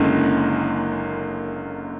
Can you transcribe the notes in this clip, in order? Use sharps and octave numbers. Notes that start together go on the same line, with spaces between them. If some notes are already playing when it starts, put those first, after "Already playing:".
Already playing: F#1 F#2 D3 G#3 A#3